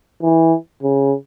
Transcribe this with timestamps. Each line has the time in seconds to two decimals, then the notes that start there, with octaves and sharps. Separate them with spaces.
0.22 E3
0.83 C#3